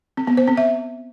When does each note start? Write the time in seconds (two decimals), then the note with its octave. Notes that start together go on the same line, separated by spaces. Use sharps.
0.17 C4
0.27 B3
0.37 C5
0.47 C4
0.57 E5